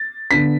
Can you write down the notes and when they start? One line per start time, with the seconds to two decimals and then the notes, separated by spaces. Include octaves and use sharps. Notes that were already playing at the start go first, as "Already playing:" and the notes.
Already playing: A6
0.31 D3 B3 D4 B6